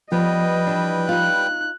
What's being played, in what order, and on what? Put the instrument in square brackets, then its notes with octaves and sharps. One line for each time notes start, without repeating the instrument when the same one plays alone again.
[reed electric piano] F3 [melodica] G3 B4 G5 [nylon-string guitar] B3 [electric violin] D#5
[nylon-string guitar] E3 D4
[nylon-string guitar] D#4 F4 [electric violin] F#6